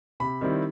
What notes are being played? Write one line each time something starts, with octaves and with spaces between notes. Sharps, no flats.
C3 B5
D#3 G3 C4 E4